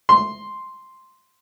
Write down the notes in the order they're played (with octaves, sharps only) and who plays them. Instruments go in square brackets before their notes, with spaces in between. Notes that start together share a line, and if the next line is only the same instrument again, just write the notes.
[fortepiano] C6